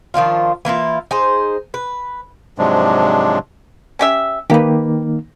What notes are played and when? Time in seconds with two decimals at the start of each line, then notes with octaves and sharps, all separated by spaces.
0.14 D#3 F3 D4 F4
0.65 E3 A#3 E4 F4
1.11 D#4 G#4 C5
1.74 B4
2.58 G#2 C3 F3 F#3 G#3 D4
3.99 C#4 G4 E5
4.50 D#3 A#3 D#4 G4 B4